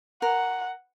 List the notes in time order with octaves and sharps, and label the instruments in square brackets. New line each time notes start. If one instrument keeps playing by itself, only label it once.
[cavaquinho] A#4 [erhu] F#5